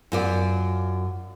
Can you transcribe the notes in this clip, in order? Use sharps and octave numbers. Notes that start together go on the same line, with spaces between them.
F#2 F4 D5